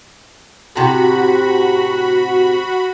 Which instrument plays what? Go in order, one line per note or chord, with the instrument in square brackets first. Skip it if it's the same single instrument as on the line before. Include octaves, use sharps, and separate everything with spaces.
[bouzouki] A2 C3 [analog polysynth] F#4 B5